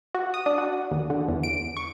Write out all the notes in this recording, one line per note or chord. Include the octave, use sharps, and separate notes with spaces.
F#4
D#6
D4
F#4
D#2
D3
E2
D7
C#6